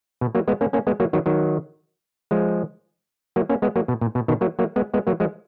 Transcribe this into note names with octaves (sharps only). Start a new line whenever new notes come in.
B2
F#3 A#3
G#3 B3
A#3 C#4
A#3 C#4
G#3 B3
F#3 A#3
D#3 F#3
D#3 F#3
F3 G#3
F#3 A#3
A#3 C#4
G#3 B3
F#3 A#3
B2
A#2
B2
B2 D#3
F#3 A#3
F#3 A#3
G#3 B3
G#3 B3
F#3 A#3
F3 G#3